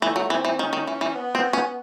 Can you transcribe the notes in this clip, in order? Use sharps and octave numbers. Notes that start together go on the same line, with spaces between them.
E3 A3
F#3
E3 C4
E3
D#3 C#4
D#3
E3
E3
B3
C4
C#4